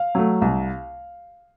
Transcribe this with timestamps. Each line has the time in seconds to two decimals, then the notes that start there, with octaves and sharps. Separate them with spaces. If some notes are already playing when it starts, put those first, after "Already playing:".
Already playing: F5
0.15 F#3 A3
0.42 C2